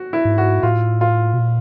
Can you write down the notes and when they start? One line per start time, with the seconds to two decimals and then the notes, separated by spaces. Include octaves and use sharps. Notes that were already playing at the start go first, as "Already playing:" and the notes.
Already playing: F#4
0.13 E4
0.25 G#2
0.38 F#4
0.63 A2 F4
1.01 F4
1.34 B2
1.39 A#2